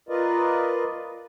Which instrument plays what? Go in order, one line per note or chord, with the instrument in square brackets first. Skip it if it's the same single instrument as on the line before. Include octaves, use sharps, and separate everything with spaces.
[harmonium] F4 A#4 B4 D5 D#5